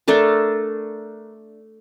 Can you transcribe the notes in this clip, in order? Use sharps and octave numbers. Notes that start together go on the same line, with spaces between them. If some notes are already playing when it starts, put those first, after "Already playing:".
A3 D4 A4 A#4